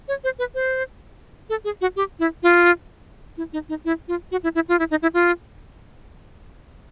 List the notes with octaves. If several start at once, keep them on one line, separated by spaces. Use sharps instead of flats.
C#5
C5
B4
C5
A4
G#4
F#4
G4
E4
F4
E4
D#4
D#4
E4
F4
F#4
E4
E4
F4
E4
D#4
E4
F4